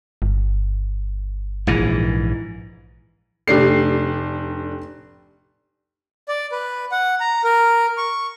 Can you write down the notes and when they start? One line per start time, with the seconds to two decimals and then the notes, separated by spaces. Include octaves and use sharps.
0.22 G1
1.67 A#1 G#2 E3
3.48 F1 A3 D4 G4 C7
6.28 D5
6.52 B4
6.92 F#5
7.20 A#5
7.44 A#4
7.97 C#6